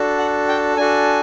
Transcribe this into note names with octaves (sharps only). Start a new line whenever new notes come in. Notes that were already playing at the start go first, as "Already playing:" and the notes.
Already playing: D4 F#4 A4
F#5
G5
D4 F#4 A4 G#5